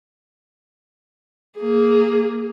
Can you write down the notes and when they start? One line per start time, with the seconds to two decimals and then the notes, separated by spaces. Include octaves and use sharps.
1.57 A#3 G#4